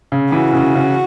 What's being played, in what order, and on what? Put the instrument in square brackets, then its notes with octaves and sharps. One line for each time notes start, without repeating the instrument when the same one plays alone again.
[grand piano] C#3
[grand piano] E3 [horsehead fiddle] F#4
[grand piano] C#3
C#3